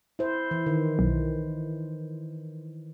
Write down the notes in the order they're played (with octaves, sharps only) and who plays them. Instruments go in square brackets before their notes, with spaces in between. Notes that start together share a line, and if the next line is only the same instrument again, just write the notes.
[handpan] E4 C5
E3
D#3
[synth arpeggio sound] B1